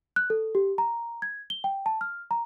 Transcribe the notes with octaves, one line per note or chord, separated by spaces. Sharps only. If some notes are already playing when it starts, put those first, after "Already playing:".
F#6
A4
G4
A#5
G#6
G7
G5
A5
F6
A#5